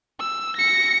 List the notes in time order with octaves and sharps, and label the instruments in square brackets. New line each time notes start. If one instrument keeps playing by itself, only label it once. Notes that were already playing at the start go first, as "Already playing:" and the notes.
[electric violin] E6
A#6 C#7